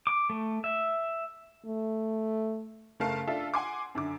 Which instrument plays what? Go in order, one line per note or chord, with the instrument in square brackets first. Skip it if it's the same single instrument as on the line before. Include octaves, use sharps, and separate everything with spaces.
[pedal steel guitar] D6
A3
E5
[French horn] A3
[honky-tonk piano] F#1 A3 A#4 F5 A5
D4 F4 A4 E5 F5
F#5 G#5 C6 D6
F#2 D3 D6